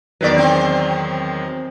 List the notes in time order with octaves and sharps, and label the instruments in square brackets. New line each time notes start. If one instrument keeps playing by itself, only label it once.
[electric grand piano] E2 D#3 F#3 [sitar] B4 D5
[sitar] C4